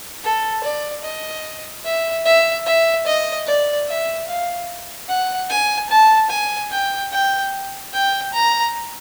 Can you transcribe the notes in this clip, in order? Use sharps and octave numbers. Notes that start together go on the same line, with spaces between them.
A4
D5
D#5
E5
E5
E5
D#5
D5
E5
F5
F#5
G#5
A5
G#5
G5
G5
G5
A#5